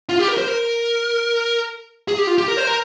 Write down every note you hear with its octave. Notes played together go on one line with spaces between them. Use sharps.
F4
G4
A#4
C5
A#4
G#4
G4
F4
G4
A#4
C5
A#4